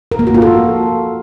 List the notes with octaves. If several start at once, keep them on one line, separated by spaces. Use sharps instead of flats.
A#4
A#3
F#4
F4
A4